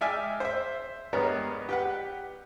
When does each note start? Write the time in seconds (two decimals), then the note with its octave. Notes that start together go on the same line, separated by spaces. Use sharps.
0.01 G#3 D5 E5 G5 G#5 F6
0.40 C5 E5
1.13 G2 G#3 B3 A#4 C#5 A#5
1.69 G4 B4 F#5